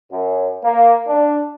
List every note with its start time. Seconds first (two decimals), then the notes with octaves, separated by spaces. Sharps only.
0.11 F#2
0.63 A#3
1.07 D4